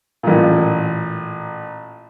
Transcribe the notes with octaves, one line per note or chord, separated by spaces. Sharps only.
A1 A#2